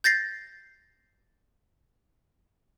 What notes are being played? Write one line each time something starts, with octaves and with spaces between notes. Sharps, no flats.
G6 A6 A#6 C7